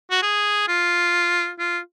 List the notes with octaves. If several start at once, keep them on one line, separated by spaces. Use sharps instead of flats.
F#4
G#4
F4
F4